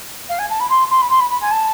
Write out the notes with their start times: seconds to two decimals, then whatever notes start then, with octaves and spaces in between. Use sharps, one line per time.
0.29 F5
0.39 G#5
0.50 A5
0.60 B5
0.69 C6
0.90 C6
1.01 B5
1.10 C6
1.20 B5
1.30 B5
1.41 G#5
1.51 A5